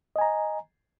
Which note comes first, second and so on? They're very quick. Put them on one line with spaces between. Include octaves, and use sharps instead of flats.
D#5 G#5 A#5